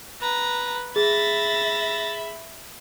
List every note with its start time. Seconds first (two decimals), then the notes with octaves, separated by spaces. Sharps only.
0.21 B4 A#5
0.96 G#4 E5 B5 A6 A#6